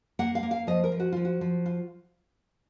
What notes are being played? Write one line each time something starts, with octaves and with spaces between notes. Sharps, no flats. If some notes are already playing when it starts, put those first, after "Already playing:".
A#3 F#5
F5
A#3
F5
F3 D#5
A#4
F3
F#4
F3 F4
F#4
F3
F4